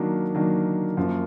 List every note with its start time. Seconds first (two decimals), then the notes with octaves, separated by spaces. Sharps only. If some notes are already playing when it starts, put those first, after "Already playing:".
Already playing: D#3 F#3 A#3 D4
0.35 D#3 F#3 A#3 D4
0.97 F#2 F3 A#3